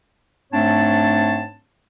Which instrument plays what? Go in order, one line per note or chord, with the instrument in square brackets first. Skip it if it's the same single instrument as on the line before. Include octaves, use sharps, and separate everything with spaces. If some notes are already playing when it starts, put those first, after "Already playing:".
[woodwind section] G#2 A3 C4 D4 C#5 A5